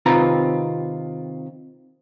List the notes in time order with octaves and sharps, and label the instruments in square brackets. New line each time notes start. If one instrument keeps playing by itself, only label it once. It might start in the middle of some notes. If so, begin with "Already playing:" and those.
[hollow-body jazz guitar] C3 D#3 C4 F4 B4 A#5